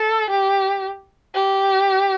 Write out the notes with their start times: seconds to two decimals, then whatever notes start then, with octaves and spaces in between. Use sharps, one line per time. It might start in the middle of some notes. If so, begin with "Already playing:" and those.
Already playing: A4
0.30 G4
1.35 G4